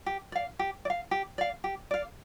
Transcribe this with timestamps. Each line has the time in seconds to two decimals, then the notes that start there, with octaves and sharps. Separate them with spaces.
0.06 G4
0.32 D5 F5
0.59 G4
0.85 D5
0.90 F5
1.11 G4
1.38 D5 F5
1.64 G4
1.91 D5 F5